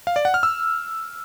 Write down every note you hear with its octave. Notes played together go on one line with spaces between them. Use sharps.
F5
D5
F#5
F6
E6